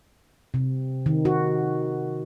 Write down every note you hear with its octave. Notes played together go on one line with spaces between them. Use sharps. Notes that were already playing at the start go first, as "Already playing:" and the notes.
C3
D#3
F#4